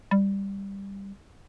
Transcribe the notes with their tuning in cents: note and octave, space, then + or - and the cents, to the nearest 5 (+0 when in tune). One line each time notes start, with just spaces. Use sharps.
G3 +10